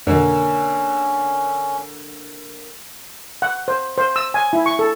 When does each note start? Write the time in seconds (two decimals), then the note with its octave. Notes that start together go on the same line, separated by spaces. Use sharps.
0.07 F2 B2 D3 D#3 A#3 C#4
3.42 F#5
3.68 C5
3.98 C5
4.16 E6
4.34 G#5
4.53 E4
4.66 C#6
4.79 A4